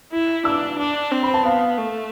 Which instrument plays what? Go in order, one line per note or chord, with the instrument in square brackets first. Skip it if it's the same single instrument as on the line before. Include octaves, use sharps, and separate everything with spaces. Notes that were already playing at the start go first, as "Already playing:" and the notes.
[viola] E4
[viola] D4 [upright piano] E6
[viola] D4
C4
[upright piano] B5
A5
[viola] B3 [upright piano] F5
[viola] A3